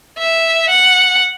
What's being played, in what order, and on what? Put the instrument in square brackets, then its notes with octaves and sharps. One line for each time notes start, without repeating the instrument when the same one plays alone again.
[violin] E5
F#5